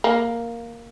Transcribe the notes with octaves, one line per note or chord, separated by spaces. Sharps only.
A#3